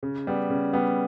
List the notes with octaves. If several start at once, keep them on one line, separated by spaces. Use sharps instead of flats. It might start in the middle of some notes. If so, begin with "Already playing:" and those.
C#3
G3 B3
C#3
G3 B3